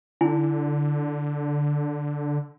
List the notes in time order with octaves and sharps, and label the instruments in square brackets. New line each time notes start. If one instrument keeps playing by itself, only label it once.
[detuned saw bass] D3 [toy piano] D#4 E4 G#5